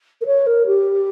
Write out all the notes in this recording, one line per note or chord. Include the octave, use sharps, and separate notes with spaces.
A#4
C#5
A#4
G4